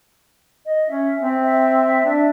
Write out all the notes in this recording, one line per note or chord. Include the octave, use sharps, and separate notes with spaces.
D#5
C#4 E5
C4
E5
D4